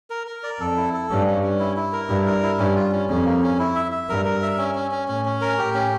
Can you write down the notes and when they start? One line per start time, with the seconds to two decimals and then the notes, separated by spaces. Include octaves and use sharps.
0.10 A#4
0.27 A#4
0.43 D5
0.60 F2 A4
0.77 E4
0.93 A4
1.10 G2 C#4
1.26 C#4
1.43 C#4
1.60 E4
1.76 E4
1.93 A#4
2.09 G2 E4
2.27 A#4
2.42 E4
2.59 G2 C#4
2.76 F4
2.92 C#4
3.09 F2 C#4
3.25 A#3
3.42 C#4
3.59 E4
3.75 E5
3.92 E5
4.09 G2 A#4
4.25 A#4
4.42 E5
4.58 C#4
4.75 C#4
4.91 C#4
5.08 A2 C#4
5.25 C#4
5.41 A#4
5.58 A2 G4
5.74 C#4